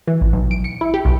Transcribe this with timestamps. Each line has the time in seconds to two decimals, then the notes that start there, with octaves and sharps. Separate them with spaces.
0.07 E3
0.21 A1
0.33 B1
0.51 D7
0.64 C#7
0.81 E4
0.94 G4
1.05 B1